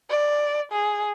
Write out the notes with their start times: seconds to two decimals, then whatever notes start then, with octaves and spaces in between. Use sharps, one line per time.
0.10 D5
0.72 G#4